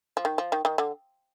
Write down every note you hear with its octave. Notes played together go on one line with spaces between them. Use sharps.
F3
D#3
F3
D#3
D#3
D3